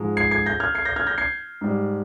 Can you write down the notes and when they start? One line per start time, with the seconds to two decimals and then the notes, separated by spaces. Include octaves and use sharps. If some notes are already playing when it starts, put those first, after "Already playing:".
Already playing: G#2 F3 G#3
0.17 G#6 C7
0.31 G#6 C7
0.46 G6 A#6
0.60 F6 G#6
0.75 G#6 C7
0.85 G6 A#6
0.96 F6 G#6
1.07 G6 A#6
1.18 G#6 C7
1.61 G#2 G3